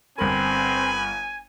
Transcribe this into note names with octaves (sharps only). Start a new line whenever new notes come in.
G1 C4 A#4 G#5 B5